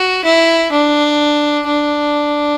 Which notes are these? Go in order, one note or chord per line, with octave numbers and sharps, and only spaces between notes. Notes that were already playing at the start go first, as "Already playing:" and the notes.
Already playing: F#4
E4
D4
D4